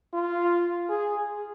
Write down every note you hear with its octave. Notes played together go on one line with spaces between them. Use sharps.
F4
G#4